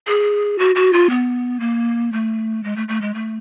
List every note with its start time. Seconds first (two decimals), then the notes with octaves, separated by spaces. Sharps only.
0.07 G#4
0.59 F#4
0.76 F#4
0.93 F4
1.10 B3
1.60 A#3
2.13 A3
2.64 G#3
2.76 A3
2.88 A3
3.01 G#3
3.14 A3